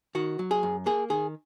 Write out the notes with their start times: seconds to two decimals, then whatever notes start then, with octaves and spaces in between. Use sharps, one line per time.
0.15 D#3 F#4
0.39 F#3
0.51 G#4
0.63 F#2
0.86 A#3 G#4
1.10 D#3 G#4